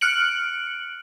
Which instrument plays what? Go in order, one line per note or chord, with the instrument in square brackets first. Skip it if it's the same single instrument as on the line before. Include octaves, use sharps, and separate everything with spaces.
[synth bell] F6 F#6 C#7 D7 F#7